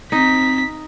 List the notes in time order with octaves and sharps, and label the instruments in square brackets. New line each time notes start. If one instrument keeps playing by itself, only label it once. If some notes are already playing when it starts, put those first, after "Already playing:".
[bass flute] C4 [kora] D#4 [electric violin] B6